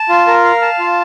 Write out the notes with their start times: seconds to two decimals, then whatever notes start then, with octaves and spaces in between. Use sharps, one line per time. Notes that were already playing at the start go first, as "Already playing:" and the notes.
Already playing: A5
0.09 F4
0.27 A#4
0.44 F5
0.62 A5
0.79 F4